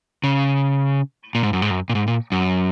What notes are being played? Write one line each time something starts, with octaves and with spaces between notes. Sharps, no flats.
C#3
A#2
G#2
F#2
G#2
F#2
A#2
G#2
A#2
F#2